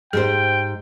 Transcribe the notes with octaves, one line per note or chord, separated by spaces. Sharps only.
G#2 G4 G#4 C5 G5